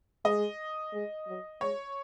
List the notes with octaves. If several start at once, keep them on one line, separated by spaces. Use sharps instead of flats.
G#3 D#5
G#3
F#3
G#3 C#5